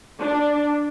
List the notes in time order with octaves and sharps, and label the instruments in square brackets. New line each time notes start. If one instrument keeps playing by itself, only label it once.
[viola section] D4